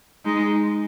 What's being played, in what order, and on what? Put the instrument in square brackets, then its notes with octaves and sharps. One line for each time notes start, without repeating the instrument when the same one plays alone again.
[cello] G#3 [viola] D#4